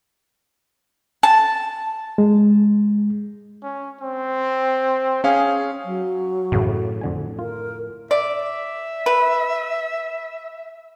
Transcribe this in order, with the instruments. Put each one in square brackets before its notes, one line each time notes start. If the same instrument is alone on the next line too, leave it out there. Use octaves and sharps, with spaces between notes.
[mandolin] A5
[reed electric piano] G#3
[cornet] C#4
C4
[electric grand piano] C#4 F5 [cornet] G#4
[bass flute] F#3
[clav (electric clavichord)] A1 F#2 C#3 [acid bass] A2
[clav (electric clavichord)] F2 D3 G#5
[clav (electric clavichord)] F4 [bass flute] A#4
[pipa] D5 [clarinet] E5
[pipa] B4